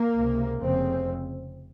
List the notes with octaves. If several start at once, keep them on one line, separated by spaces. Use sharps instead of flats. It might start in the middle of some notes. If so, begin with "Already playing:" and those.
Already playing: A#3
C#2 C3
F1 F2 C#3 C4